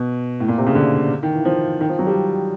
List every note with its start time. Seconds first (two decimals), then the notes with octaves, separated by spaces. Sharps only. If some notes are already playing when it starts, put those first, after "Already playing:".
Already playing: B2
0.40 A2
0.48 A#2
0.58 C3
0.66 C#3
0.75 D3
1.23 D#3
1.34 E3
1.45 F3
1.81 D#3
1.89 F3
1.99 F#3
2.07 G3